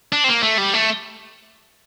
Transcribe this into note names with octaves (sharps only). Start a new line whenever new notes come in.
D4
C4
A#3
A3
G3
A3